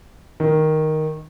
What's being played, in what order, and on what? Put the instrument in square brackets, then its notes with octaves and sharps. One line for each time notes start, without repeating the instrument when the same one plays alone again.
[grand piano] D#3